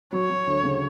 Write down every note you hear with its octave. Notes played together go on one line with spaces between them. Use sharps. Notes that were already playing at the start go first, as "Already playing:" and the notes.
F#3 C#5
F#3
D2
C#3